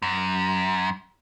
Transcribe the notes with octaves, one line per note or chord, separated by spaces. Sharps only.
F#2